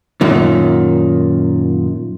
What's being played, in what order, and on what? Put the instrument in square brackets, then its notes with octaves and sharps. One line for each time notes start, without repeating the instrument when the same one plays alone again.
[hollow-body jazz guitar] F#2 A#2 D#3